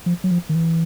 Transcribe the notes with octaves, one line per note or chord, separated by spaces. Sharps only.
F3
F#3
F3
D#3
E3